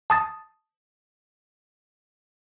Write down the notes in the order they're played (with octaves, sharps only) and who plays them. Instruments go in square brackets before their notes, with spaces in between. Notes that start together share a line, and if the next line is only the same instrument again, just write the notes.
[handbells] A5 D#6 A6